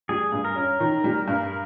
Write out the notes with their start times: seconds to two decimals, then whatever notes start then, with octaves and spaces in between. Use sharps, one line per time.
0.09 G3 G#4
0.32 G2
0.45 A#4
0.56 C#4
0.80 D#3
1.04 G3
1.28 G2